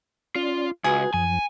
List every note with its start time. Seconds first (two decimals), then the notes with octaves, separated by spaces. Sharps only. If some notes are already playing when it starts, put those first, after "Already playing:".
0.36 C#4 F4 D5
0.84 C#2 F#4 G#4 B4
1.14 F#2 F3 G#5